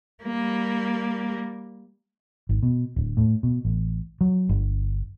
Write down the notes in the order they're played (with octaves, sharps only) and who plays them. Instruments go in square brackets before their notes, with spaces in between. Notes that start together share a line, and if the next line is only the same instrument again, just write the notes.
[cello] G3 A#3
[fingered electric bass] G#1
B2
D1
A2
B2
A1
F#3
G1